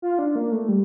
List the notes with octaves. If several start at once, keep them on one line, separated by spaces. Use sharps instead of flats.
F4
D4
A#3
A3
G3